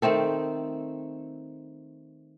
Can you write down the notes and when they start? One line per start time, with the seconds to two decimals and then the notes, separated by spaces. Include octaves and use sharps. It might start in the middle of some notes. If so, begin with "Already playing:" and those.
0.02 D#3 A3 C4 A4